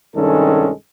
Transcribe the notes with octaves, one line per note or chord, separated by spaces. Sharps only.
C2 G2 D#3 G#3 C#4 A4